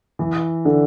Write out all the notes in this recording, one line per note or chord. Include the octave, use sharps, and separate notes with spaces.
E3
D3